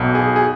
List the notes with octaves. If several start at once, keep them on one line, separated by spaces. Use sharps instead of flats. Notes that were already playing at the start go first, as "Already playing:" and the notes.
Already playing: B1 B2
G#4
G#4